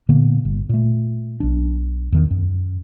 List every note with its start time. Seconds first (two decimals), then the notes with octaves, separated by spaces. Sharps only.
0.09 A#2 D3 A#3 B3
0.45 G1
0.69 A#2 A3
1.40 B1 D4
2.12 E2 D#3
2.31 F#2